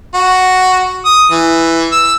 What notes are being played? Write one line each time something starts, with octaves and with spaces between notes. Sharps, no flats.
F#4
D#6
E3
E6